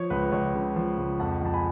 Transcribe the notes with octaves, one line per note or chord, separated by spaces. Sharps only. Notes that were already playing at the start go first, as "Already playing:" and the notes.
Already playing: F3 C#5
C#2 B4
C#2 C#5
C#3
F3
C#2
F2 F#5 A5
F2 A5
G#5 B5